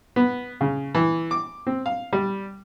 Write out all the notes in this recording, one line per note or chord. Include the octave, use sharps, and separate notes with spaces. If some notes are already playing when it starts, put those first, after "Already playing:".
B3
C#3
E3
D6
C4
F5
G3